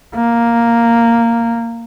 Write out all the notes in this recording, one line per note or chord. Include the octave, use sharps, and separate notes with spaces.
A#3